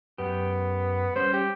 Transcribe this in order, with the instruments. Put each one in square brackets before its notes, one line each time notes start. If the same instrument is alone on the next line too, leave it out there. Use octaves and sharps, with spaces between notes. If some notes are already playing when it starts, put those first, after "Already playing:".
[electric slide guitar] F#2 G4 [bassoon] B3
[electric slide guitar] G3 C#4 [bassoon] C5
[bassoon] G4